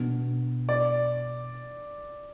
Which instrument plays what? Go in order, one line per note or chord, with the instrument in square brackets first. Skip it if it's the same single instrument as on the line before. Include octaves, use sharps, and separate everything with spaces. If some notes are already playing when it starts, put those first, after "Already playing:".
Already playing: [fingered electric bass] B2 B3 D4
[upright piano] D5